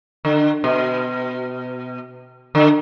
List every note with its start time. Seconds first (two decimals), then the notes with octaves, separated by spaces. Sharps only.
0.25 D3
0.64 B2
2.55 D3